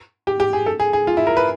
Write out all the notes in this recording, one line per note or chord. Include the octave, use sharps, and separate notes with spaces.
G4
G4
G#4
A4
G#4
G#4
F4
E4
A#4
B4